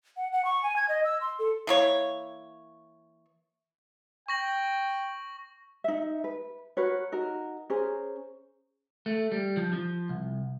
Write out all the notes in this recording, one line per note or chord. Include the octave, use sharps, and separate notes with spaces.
F#5
F#5
C#6
G#5
G#6
D#5
E6
C6
A4
E3 A#3 C#5
G5 C#6 A#6 F#7
D#4 E5
B4
F#4 A#4 B4 C#5
D#4 F#4 A#4
C#4 G#4 A#4 C5
A3
G3
F3
F3
C2